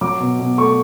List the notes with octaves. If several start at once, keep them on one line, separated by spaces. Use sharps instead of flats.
F#3 D6
B2
B2
A3 C#6